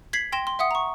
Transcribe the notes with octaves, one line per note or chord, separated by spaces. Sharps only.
G#6 B6 C7 F#7
G5 C6 A#6 E7
C6
E5 F#5 D#6 C#7
A#5 C#6